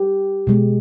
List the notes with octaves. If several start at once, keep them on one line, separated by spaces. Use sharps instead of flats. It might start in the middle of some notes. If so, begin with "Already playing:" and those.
Already playing: G4
B2 G#3